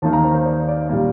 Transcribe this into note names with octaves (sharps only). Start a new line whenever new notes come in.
D#2 D#3 A#3 D#4 A5
A#5
C5
C5
D5
D5
A#2 G3 A#3